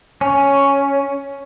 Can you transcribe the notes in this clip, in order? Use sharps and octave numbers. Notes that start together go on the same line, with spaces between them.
C#4